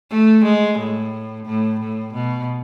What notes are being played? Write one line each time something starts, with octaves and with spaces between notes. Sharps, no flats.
A3
G#3
A2
A2
A2
B2